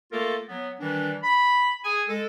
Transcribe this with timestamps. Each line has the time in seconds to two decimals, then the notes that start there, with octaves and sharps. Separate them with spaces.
0.12 A3 A#3 F4 A4 A#4
0.49 F#3 B3
0.79 D#3 E3 G3 D4
1.23 B5
1.84 G#4 G#5
2.08 G#3 A4